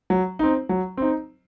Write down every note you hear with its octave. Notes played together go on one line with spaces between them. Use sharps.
F#3
C4 D#4
F#3
C4 D#4